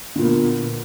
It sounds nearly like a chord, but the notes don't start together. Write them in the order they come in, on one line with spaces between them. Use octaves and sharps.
D3 A#2 B3 A#3